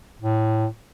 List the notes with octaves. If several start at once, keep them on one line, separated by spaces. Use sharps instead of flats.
A2